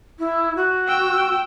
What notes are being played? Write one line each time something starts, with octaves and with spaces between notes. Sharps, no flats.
E4
F#4
G5 E6